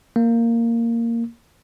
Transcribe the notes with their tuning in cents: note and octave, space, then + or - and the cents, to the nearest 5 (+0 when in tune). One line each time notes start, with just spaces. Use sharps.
A#3 -10